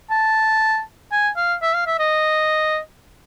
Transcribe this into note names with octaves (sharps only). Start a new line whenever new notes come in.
A5
G#5
F5
E5
F5
E5
D#5